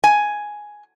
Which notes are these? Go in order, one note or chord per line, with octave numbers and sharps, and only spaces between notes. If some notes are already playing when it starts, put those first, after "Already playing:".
G#5